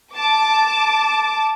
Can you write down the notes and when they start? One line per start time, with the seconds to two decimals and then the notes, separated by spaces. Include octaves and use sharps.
0.15 A5 D6